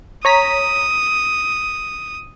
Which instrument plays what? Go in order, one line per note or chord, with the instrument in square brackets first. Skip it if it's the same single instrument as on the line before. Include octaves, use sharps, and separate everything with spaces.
[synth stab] C#5 A#5 B6 [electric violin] D#6